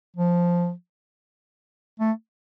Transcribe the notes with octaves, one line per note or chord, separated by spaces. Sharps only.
F3
A3